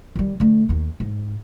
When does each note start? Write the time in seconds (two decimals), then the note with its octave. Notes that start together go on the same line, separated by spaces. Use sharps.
0.16 D#3 G3
0.40 D3 A3
0.69 D#2 D#3
1.00 G#2